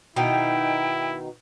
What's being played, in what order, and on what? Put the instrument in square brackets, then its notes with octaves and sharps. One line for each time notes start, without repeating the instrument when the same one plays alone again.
[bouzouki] B2 D#3 D#4 [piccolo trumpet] E4 [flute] G5